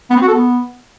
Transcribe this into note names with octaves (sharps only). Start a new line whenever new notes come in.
B3
C4
F#4
A4
B3